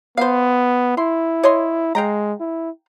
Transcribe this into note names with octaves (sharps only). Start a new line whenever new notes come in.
B3 C5 F5
E4 C6
C#5 D#5 C6
G#3 F5 G5 A#5
E4